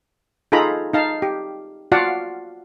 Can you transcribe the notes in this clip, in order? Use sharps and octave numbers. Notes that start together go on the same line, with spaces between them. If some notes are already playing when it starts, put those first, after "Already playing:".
D#4 F4 G#4 A4 A#5 B5
D#4 F5 A5
G4
F4 F#4 D5 F5 F#5 A5